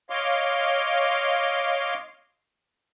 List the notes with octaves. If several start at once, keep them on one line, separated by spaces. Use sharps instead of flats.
C#5 D#5 F5 C6 D6